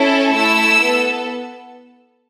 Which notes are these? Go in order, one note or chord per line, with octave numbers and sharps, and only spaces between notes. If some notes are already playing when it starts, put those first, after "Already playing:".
Already playing: C#4 E4 A4
A3 E4 A4 E6
B3 A4